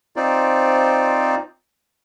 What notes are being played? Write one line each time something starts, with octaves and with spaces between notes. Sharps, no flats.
C4 D#4 F4 C5 D5